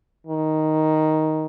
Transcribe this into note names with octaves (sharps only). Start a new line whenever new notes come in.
D#3